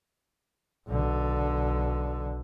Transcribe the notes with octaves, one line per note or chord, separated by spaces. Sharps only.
B1 D3